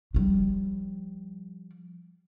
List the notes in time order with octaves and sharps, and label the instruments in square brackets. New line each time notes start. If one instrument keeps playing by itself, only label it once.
[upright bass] F3 G3